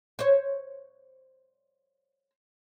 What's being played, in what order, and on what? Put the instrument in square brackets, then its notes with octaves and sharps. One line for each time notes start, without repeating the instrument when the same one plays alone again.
[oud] C5 C#5